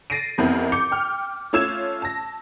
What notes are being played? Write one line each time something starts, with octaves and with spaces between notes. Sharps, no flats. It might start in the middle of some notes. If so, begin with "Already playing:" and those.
A6 A#6 C7 D7 D#7
A1 F2 B3 C4 E4 A#4
D6 G6 C#7
G5 F6
A3 C#4 F4 E6 G#6 E7
A5 A#6